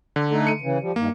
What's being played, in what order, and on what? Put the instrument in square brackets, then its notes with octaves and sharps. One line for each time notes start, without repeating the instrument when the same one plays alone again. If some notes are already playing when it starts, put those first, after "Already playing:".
[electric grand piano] D3
[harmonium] A3 D#4 A4
[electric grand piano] C#7 D#7
[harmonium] C#3 E3
F3 G3
[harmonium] G2 D#3 [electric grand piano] A#3